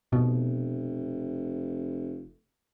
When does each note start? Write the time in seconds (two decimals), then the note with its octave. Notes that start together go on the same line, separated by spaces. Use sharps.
0.13 F1 B2